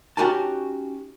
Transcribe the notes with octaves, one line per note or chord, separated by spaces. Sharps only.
C#4 D#4 F#4 G4 G#5 A5